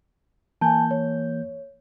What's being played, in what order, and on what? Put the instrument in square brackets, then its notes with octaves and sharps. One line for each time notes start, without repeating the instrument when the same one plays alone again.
[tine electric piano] E3 A#3 G6 [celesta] G#5 A5
[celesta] C#5